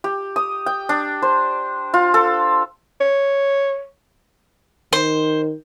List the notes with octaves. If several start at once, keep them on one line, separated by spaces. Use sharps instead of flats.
G4
D#6
G5
D4
C5
F4
A4
C#5
D#3 C5